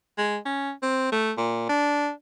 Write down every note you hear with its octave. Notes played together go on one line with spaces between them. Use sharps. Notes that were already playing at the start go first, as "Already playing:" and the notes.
G#3
C#4
C4
A3
A#2
D4